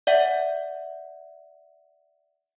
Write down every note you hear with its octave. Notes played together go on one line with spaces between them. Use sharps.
D5 E5 F#5